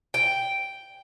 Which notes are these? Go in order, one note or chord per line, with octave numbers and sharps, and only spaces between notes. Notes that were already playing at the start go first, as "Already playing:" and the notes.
G5